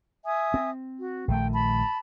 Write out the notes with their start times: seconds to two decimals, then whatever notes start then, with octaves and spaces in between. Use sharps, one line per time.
0.25 E5 G#5 D#6
0.54 C4
0.99 F#4
1.28 A#1 D#3 A3 G5
1.53 A5 B5